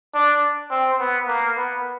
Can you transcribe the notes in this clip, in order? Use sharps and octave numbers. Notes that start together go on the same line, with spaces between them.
D4
C4
B3
A#3
B3